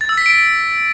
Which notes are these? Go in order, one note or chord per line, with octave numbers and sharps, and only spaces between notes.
A6
E6
B6
D7